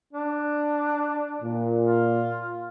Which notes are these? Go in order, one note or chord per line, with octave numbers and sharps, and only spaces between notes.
D4
A#2
F4